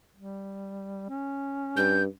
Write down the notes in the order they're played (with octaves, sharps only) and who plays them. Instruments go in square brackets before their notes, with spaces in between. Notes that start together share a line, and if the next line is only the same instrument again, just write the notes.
[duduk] G3
C#4
[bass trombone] G2 [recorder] G6